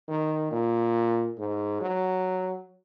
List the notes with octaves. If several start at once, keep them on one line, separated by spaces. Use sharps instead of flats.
D#3
A#2
G#2
F#3